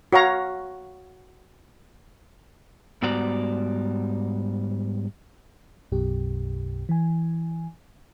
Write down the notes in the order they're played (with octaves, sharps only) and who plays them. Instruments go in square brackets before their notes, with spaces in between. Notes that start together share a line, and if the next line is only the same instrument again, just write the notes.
[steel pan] F#4 C#5 F5 A#5
[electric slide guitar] G#2 G3 B3 F#4 D5 A#5
[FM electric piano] B1 F#2 B2 G4
E3 G#5